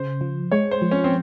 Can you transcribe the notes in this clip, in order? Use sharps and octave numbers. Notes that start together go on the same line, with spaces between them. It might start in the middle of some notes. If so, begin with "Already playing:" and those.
Already playing: C#3 C5
F3
G#3 C#5
C5
F3
C#4
C4